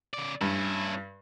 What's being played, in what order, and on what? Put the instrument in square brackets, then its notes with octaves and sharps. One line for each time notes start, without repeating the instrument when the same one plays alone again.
[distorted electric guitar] C#3 D5
[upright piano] G2 [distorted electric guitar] C#4 E4